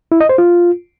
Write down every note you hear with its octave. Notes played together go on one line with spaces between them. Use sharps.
E4
D#5
C5
F4